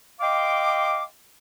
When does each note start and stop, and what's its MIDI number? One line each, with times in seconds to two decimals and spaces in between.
0.20 1.04 75
0.20 1.04 77
0.20 1.04 79
0.20 1.04 84
0.20 1.04 86